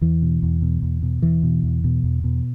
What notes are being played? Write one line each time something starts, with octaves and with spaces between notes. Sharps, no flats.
E2 E3
B2
E2
B2
E2
B2
E2 E3
B2
E2
B2
E2
B2